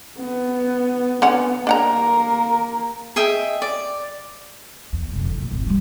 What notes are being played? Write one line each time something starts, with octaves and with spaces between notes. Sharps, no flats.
B3
D3 B3 C#4 F#5
A#3 D4 A#4 F#5 A#5
G#4 D#5 E5 G5
D5
E2
F1 F2
D3 D#3
F2 A#2
G#1 G#2
F3 G3